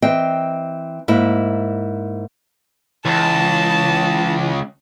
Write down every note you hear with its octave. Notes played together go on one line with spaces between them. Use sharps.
E3 C4 D#5 G5
G#2 A#3 E4
C#2 E3 A5